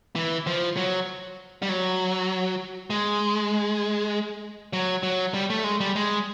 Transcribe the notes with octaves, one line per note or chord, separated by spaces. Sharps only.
E3
F3
F#3
G3
F#3
G#3
F#3
F#3
G3
A3
G#3
G3
G#3